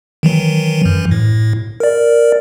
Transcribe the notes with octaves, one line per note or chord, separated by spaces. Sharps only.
D#3 E3 F#3
F#2 E3
A2
A#4 D5